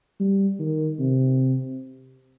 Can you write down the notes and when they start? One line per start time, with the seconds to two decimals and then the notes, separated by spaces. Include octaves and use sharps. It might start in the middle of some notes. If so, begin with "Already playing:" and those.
0.20 G3
0.59 D#3
0.99 C3